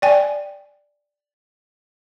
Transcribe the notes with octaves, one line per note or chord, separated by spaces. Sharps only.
D5 G5 G#5